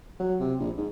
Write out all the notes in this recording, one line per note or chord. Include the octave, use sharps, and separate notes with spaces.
F#3
C3
A#1
G#2